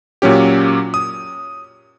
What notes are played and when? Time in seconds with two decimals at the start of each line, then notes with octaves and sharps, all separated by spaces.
0.22 A#2 F#3 C#4 G4
0.94 D#6